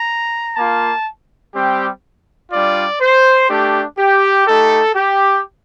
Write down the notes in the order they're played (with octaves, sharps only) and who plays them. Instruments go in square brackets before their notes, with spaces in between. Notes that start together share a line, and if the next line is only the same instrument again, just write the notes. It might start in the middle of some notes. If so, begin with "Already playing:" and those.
Already playing: [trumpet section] A#5
A#3 F4 A5
G3 C4 G4
G3 D4 F4 D5
C5
A3 D4 G4
G4
A3 D#4 G4 A4
G4